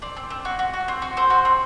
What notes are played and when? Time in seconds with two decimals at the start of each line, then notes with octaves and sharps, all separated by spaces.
0.02 C4 D5
0.17 C4
0.30 C4
0.45 F#4
0.59 F#4
0.74 F#4
0.88 C4
1.02 F#4
1.17 C4 C5
1.30 F#4
1.45 C4